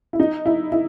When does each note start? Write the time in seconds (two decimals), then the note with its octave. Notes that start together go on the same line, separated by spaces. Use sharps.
0.13 E4
0.20 D#4
0.46 E4
0.72 E4